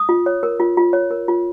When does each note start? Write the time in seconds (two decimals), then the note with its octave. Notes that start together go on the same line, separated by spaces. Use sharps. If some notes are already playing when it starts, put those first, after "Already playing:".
Already playing: D#6
0.09 F4
0.26 C#5
0.43 A#4
0.60 F4
0.77 F4
0.93 C#5
1.11 A#4
1.28 F4